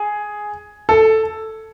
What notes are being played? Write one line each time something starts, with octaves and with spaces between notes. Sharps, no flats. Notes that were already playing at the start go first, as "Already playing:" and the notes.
Already playing: G#4
A4